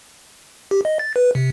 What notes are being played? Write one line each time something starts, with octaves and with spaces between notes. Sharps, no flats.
G4
D#5
A6
B4
C3